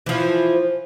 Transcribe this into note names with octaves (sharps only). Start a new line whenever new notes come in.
E3 F3